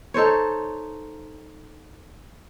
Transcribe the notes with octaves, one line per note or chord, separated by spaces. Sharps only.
D#4 A4 C5 C#5